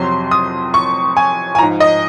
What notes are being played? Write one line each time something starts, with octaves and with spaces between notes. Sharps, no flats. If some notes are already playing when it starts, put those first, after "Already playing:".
Already playing: F2 C3 F#3 C6
D#6
C#6
G#5
G#5
G#2 F3 A#5
D#5